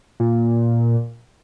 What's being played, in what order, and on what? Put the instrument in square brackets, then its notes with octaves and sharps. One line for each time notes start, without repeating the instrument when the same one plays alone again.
[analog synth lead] A#2